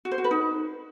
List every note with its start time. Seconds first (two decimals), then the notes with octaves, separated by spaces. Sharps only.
0.05 F#4
0.12 C5
0.18 F#4
0.24 B4
0.31 D#4